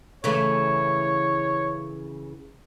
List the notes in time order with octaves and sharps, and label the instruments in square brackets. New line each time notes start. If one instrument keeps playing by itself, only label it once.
[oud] C#3 E3 A3 [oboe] C#5